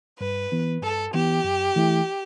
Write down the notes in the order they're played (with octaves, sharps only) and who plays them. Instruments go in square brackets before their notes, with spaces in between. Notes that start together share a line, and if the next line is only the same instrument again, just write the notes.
[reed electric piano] G2 [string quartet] B4
[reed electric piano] E3 B3
[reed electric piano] G2 [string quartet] A4
[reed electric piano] E3 B3 [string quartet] G4
[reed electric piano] F#2
E3 A3 E4